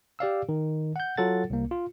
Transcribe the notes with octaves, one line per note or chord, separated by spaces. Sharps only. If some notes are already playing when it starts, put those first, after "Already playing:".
G4 D5 F5 E6
D#3
F#5 G6
F#3 F4 A4 F#5 A6
C2 A#3
F4